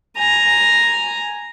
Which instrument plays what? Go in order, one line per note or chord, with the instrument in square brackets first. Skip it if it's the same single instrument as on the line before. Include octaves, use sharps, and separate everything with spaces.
[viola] G#5 A#5